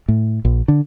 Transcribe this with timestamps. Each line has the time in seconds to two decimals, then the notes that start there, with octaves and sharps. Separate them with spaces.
0.08 A2
0.45 A#1
0.68 D3